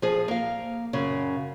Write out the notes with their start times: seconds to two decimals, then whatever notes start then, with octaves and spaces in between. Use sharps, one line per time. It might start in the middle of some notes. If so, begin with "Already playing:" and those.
0.02 F3 G#4
0.28 A#3 F5
0.93 F#2 C#3